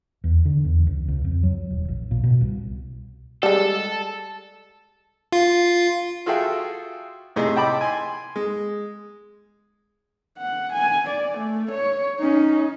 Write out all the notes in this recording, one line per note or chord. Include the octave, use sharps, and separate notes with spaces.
E2
D3
E2
C#2
C#2
F2
F#3
D#1
A#1
A#2
B2
C2
G3 G#3 A4
F4
F4 F#4 G#4 A4 E5 G5
A2 C3 G#4 D#5 C6 E6
D#5 G5 A5 B5 D6 E6
G#5 C6
G#3
F#5
G#5
D5
A3
C#5
C#4 D#4